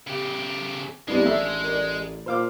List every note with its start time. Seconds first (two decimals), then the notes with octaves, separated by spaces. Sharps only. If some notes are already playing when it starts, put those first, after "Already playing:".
0.07 C#3 G4
1.08 C2 G3 G#3 B3 D4
1.22 A1 A3 D4 E5
1.64 A#4 D5
2.26 A#2 C5 F5 D6